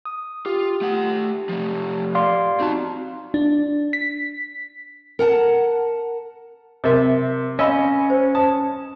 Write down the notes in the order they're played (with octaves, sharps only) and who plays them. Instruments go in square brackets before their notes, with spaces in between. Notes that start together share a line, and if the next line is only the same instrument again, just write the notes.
[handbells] D#6
[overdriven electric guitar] F4 [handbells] G4
[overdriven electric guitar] A3 F#5
F3 A3
[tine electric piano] D5 F5 C6
[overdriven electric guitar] C4 A5 [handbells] D#4 F#4
[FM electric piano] D4
B6
[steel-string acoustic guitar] A#4 F#5 G5 A5
[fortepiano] C3 E5 [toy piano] A#4 D#5
[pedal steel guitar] C#4 [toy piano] C#5 F5 B5 [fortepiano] D#5 E6
[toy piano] C5
[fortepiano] A5 [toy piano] D#6